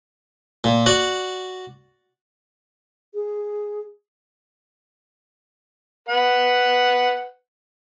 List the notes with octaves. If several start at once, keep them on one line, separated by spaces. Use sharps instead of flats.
A#2
F#4 D5 F#5
G#4
B4 F#5